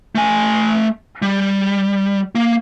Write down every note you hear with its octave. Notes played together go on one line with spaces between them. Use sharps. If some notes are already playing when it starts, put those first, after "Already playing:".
A3 G#5
G3
A#3